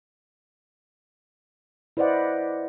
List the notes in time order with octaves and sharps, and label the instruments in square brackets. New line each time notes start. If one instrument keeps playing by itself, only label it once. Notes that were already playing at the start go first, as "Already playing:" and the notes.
[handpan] E4 B4 C5 D5 D#5 F#5